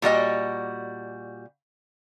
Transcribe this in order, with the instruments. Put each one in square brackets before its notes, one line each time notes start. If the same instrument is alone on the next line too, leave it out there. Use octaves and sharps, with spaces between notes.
[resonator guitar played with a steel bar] A#2 G3 F#4 D#5